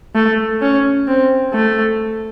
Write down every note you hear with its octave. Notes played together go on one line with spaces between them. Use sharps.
A3
C#4
C4
A3